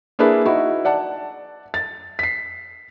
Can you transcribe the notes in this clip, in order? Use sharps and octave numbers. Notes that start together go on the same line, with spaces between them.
A#3 D4 E4 G#4 B4
D#4 E4 F#4
D5 F#5 A5
A6
B6 C7